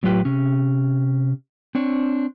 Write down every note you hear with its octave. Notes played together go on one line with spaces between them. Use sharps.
A2 F#3 F4 G4 B4 G5
C3 C#4
C4 D4 C#5